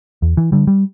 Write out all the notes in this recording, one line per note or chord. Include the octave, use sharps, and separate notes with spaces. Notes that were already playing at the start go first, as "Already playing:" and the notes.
E2
E3
D3 G3
G3